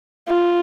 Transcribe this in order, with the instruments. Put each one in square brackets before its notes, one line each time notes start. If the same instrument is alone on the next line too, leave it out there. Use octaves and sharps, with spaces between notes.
[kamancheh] F4